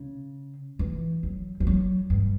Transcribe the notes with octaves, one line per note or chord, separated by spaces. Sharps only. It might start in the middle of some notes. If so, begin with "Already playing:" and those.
Already playing: C#3
E3
F#3
E3
F#3
G2